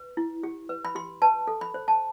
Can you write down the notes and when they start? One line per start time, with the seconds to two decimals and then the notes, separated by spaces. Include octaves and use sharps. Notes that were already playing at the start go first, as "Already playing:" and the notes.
Already playing: B4
0.17 E4
0.43 G4
0.69 B4
0.85 B5
0.95 G4 C6
1.22 B4 A5
1.47 A4
1.61 B5
1.74 C5
1.88 A5